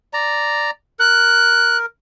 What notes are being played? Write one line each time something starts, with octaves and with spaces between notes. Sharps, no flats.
D5 A#5
A#4 F#6